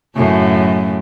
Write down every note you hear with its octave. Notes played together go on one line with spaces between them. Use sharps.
F#2 A2 C#3